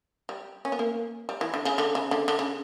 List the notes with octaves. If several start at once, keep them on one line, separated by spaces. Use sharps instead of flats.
G3
C#4
B3
A#3
G3
E3
D3
C#3
D3
C#3
D3
D3
C#3